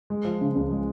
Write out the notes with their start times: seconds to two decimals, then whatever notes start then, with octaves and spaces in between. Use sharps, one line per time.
0.10 G#3
0.25 F3
0.41 C#3
0.55 C#2
0.71 G#3